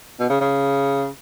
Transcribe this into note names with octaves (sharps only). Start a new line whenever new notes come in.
B2
C#3
C#3